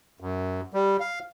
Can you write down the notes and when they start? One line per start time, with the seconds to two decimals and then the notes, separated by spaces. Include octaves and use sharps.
0.20 F#2
0.74 G3
1.00 F5